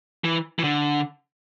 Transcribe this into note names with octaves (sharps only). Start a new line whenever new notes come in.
E3
E3
D3